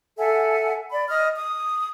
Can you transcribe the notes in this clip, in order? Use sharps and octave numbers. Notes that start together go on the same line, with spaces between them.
A4 E5 F#5 G#5
D5 B5
D#5 D#6 F6
D#6